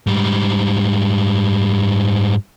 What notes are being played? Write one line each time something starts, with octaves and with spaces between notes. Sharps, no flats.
G#2 G3